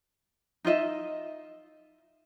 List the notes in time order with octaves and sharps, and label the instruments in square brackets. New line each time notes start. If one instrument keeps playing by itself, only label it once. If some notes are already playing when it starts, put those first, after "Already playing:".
[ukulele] D#4 F4 D#5 E5